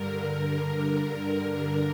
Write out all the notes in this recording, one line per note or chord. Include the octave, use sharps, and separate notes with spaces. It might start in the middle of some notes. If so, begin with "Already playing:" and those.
Already playing: G2 D3 A#4